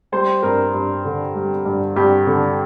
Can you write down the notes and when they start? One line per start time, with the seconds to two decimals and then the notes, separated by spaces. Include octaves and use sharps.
0.12 G3 C5
0.43 G2 A#4
0.74 G2
1.05 D3
1.35 G3
1.65 G2
1.96 G2 G4
2.27 D3